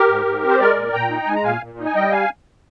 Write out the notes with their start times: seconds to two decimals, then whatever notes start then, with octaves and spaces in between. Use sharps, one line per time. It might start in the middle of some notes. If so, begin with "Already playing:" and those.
Already playing: G4 A#4
0.09 G#2
0.26 G#2
0.43 C4
0.49 C5
0.59 G#3 A#4 D5
0.77 A#2
0.93 A#2 G5 A#5
1.10 D#4
1.27 G#3 G#5
1.36 A#5
1.44 A#2 F5 G#5
1.61 A#2
1.78 D#4
1.85 G#5
1.95 G3 D#5 G5
2.12 F5 G#5